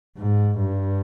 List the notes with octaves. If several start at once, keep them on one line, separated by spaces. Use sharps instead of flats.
G#2
G2